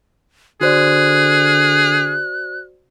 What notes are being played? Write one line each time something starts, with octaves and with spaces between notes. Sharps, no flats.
D3 F#4 G#4 C5 D5 F#6